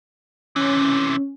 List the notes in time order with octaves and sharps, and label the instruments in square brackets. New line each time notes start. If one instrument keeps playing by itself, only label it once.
[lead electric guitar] C3 E3 [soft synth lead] C#4